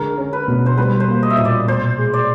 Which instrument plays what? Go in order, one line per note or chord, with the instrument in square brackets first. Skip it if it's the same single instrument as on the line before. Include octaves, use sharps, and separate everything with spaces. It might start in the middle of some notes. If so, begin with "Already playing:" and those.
Already playing: [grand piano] D3 G#3 [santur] A#4
[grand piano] C#4
[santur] B4
[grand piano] B2
[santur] C5
[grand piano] G3 [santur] B4
[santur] C5
[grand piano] A#3
[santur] D#5
E5
[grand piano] A#2 [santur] D#5
[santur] D5
[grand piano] B2 [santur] C5
[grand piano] G#3
[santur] D5